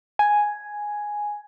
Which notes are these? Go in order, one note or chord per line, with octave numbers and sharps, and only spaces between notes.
G#5